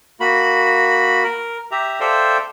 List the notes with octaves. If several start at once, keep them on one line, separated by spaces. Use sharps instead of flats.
A#3 F#4 B5
A#4
G4 E5 A#5
A4 C5 D5 E5 F5 G5